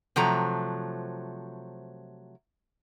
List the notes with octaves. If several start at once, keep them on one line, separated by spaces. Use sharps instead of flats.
C3 F3 F#3 A3 A#5